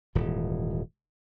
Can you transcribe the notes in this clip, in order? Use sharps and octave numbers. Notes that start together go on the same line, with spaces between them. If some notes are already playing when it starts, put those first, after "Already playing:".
D#1 G#2 E3